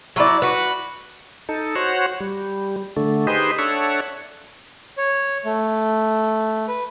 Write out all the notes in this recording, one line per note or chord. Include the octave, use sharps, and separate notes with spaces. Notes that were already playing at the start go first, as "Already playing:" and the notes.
F#3 E4 D5
F#4 B4
D#4 A4
F#4 C5 C#5 F#5
G3
D3 A3
D#4 G4 G#4 B4 C5 D#5
D4 A4 C#5 E5 F#5
C#5
A3
B4